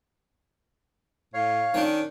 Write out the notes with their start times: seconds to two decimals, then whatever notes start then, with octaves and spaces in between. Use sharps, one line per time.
1.34 A2 C#5 F5
1.74 D#3 C#4 D4